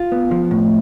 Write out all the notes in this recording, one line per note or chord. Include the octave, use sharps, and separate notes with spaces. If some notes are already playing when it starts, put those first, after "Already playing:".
Already playing: F4
B3
F3
A2